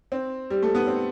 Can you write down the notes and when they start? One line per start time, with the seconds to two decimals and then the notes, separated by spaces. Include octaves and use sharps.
0.12 C4
0.50 G3
0.62 A3
0.75 B3
0.87 C4